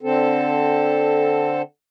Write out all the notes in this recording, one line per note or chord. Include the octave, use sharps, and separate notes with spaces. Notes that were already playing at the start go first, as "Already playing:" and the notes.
D3 C4 A4